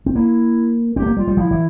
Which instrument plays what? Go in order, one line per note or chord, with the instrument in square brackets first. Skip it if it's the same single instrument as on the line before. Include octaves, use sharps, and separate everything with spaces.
[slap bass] C4
[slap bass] A#3 [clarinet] E4
[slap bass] C4 [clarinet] G4
[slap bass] A3
A#3
[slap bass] G3 [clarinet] F4
[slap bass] G3
[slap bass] F3 [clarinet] E4
[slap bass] E3